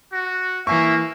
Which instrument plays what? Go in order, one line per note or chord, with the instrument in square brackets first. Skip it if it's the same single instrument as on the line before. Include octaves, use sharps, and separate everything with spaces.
[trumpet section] F#4
[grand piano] E3 G#5 C#6 [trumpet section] A#3 [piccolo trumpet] E5